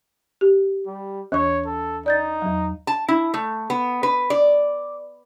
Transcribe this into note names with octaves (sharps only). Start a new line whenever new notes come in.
G4
G3
D#2 E3 C#5 C#6
A4
D#4 D5 G6 A6
E2 F#3
A5
E4
A3
B3
B4
D5